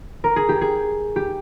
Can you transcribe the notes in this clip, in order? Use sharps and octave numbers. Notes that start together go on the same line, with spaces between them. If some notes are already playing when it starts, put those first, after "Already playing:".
A#4
G#4
G4
G#4
G4